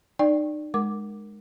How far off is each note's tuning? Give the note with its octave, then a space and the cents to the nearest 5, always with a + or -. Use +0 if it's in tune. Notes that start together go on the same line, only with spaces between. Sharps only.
D#4 -35 D5 +0 G5 +15
G#3 +5 A#4 +0 D6 +0